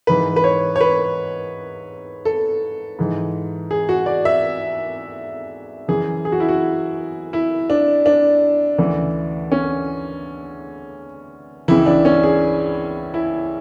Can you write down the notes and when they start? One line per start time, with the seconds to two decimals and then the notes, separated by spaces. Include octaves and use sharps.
0.07 G#2 E3 B4
0.36 B4
0.44 C#5
0.76 C#5
0.81 B4
2.25 A4
2.99 G#2 E3
3.71 G#4
3.89 F#4
4.06 D5
4.25 E5
5.88 F#2 E3 G#4
6.25 G#4
6.32 F#4
6.40 E4
6.49 F#4
7.33 E4
7.70 D4
8.06 D4
8.78 D2 C#3 E3
9.52 C#4
11.68 C#2 C#3 E3 E4
11.86 D4
12.05 C#4
12.23 G#4
13.14 E4